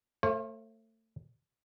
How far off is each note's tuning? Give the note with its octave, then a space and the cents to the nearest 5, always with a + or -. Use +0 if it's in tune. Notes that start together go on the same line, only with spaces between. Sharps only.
A3 +25 C5 +45 F5 -15